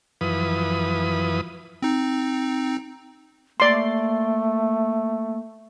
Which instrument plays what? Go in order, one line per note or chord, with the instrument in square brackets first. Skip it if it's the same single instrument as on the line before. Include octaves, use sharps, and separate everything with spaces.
[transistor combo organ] F#2 E3 F3 B4 D#6
[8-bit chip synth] C4 D#4
[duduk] A3 [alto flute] A#3 [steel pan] D5 C6